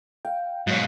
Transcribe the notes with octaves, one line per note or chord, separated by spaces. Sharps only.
F5 G5
G#2 B2 F#3 C#5